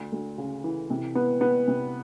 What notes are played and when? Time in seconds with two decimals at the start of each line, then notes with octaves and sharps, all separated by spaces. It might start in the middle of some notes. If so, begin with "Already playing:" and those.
Already playing: D2
0.12 D2
0.38 C#3
0.64 E3
0.90 C3
1.15 B3
1.41 B3
1.68 C3